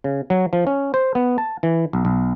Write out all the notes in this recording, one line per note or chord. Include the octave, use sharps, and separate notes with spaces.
C#3
F#3
F3
C#4
C5
B3
A5
E3
B1
B1